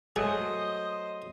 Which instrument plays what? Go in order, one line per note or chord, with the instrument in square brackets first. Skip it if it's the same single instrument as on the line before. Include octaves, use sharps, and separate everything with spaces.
[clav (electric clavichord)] F#3 A3 [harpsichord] G#4 [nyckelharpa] C5 D#5 [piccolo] D#6